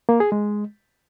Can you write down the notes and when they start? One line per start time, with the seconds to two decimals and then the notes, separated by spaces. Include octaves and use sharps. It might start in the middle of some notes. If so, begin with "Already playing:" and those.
0.09 A#3
0.20 G#4
0.32 G#3